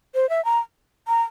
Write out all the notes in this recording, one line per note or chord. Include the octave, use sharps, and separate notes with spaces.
C5
E5
A#5
A#5